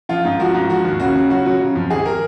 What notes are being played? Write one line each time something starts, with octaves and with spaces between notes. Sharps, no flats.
F3 F4
G#2
F3 F#4
G#2
F3 F#4
D#2
C#3 F#4
C#3
F#3 F#4
F#3
C#3
F2
G#1 G#4
A#4